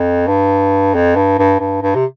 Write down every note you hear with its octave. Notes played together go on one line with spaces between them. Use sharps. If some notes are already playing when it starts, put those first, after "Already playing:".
Already playing: F2
G2
F2
G2
G2
G2
G2
C3